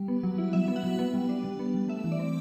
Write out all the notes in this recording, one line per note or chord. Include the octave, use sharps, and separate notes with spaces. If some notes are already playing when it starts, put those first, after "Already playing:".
Already playing: G3
B3
F#3
E4
F#3 E5
B3
F#5
F#3
B3
G3
D4
G3
B3
G3
A3 E5
E3
D5
C4